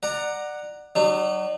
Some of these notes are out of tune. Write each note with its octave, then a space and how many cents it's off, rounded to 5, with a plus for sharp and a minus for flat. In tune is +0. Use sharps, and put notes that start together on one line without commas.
D5 +25 F#5 +0 A#5 +0
F#3 +30 D#4 -40